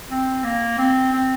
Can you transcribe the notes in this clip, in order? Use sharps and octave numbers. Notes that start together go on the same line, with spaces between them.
C4
A#3
C4
C4